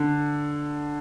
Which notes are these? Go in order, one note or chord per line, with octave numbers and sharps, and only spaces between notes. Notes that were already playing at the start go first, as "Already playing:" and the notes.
Already playing: D3